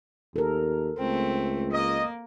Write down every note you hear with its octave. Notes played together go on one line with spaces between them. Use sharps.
D#2 A4 A#4
C#2 A3 C4
A#3 D#5